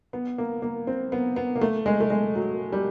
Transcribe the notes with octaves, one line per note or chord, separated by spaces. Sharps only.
B3
A#3
A#3
C4
B3
B3
A#3
A3
G#3
A3
G#3
F#3
G3